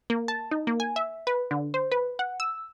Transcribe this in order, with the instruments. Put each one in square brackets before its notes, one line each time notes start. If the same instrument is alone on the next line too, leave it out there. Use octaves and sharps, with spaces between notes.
[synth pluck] A#3
A5
D#4
A#3
G#5
E5
B4
D3
C5
B4
F#5
E6